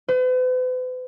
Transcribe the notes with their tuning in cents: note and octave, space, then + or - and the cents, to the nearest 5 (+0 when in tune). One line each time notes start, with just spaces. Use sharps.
B4 +45